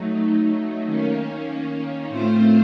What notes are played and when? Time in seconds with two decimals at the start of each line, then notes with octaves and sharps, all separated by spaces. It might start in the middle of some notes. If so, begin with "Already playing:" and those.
Already playing: F#3 A3 D#4
0.86 D#3 A#3 C#4
2.09 A2 A3 C4 F4 C5